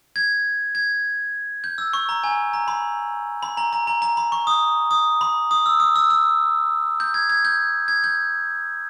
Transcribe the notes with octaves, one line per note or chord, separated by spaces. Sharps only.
G#6
G#6
G6
E6
C#6
A#5
G#5
A#5
B5
B5
A#5
A#5
A#5
A#5
B5
C#6
D#6
D#6
B5
D#6
E6
D#6
E6
E6
G6
G#6
G#6
G6
G#6
G6